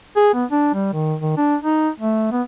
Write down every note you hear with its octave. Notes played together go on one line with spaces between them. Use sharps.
G#4
B3
D4
G3
D#3
D#3
D4
D#4
A3
B3